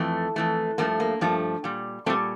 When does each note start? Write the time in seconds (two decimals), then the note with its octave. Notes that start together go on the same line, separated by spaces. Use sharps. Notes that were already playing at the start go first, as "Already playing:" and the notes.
Already playing: F2 E3 A3
0.36 F2 E3 A3
0.78 G2 F3 A3 A#3
1.00 A#3
1.21 G2 F3 A3
1.64 A#2 G3
2.06 A#2 G3 A3 C4